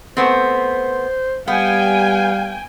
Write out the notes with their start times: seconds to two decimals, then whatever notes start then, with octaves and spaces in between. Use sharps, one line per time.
0.17 A3 B3 C4 C5
1.48 G3 B3 F5 G5 G#5